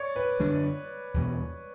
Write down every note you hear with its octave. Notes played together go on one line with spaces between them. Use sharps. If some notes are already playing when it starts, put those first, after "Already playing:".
Already playing: C#5 D5
B4
F#2 D3 G3 D4
E2 B2 G3 B3